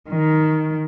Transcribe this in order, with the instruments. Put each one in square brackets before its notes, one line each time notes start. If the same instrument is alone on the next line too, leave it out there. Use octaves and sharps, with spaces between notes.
[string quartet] D#3